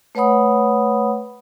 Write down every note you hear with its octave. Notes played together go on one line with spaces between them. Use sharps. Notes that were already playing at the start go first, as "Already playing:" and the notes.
A3 B4 C#5 F#5 B5 D#6